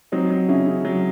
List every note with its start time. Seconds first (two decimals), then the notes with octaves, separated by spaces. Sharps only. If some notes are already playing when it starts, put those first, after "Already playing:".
0.12 F#3 C4 D#4
0.30 F#3
0.48 C#3 C#4 E4
0.67 C#3
0.85 F#3